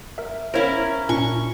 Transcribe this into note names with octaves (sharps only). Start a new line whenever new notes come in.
A#4 E5
C#4 E4 A#4 C5 C#5 F5
A#2 C#4 D4 C#6